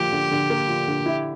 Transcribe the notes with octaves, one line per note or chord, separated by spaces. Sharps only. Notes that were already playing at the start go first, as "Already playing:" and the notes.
Already playing: D3 F3 A#3 G4
D3
D3
A#3
F3
D3
E4